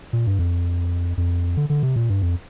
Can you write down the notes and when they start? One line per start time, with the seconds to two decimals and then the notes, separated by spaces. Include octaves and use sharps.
0.13 A#2
0.27 G2
0.39 F2
1.18 F2
1.57 D3
1.70 D3
1.83 C3
1.96 A#2
2.10 G2
2.22 F2